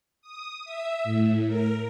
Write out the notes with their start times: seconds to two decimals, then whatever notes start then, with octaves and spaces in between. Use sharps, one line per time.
0.22 D#6
0.65 E5
1.04 A2
1.47 A#4